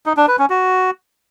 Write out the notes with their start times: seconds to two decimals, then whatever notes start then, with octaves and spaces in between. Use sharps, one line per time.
0.06 D#4
0.17 D4
0.28 B4
0.39 C#4
0.50 F#4